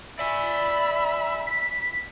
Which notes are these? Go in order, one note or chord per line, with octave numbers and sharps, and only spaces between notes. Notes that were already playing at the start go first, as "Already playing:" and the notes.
D5 E5 G#5 B5
B6